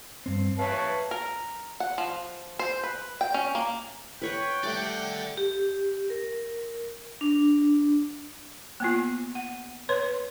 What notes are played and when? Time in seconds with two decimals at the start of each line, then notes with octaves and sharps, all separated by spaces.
0.26 G2 C4
0.59 B4 C#5 E5 F5 A5
1.11 A#4
1.80 F#5
1.98 F3
2.59 C5
2.83 B4
3.21 G5
3.34 C#4
3.55 A#3
4.22 B4 C#5 F#5 G5
4.64 G3 A3 D5 F#5 D6
5.38 G4
6.10 A#4
7.21 D4
8.80 A#3 B3 F4
9.35 F#5
9.89 B4 C#5 C6